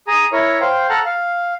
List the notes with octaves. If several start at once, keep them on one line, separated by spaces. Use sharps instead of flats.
G#4 G#5 A#5
E4 A#4 C#5
C5 F5 G5
A4 F#5 A5 A#5 F6 F#6
F5